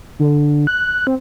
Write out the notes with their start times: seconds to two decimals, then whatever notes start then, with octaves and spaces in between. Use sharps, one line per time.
0.19 D3
0.67 F#6
1.07 C4